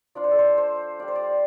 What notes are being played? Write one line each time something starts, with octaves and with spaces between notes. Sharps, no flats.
F3 D4 F4 D5
C5
A4
C5
C5
G3 F4 D5
C5
D5